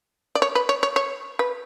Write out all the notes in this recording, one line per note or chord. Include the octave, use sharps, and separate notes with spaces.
D5
C#5
B4
C#5
C#5
C#5
B4